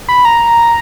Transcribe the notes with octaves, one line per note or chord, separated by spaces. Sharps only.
B5
A#5